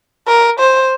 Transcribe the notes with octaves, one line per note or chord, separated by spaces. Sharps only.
A#4
C5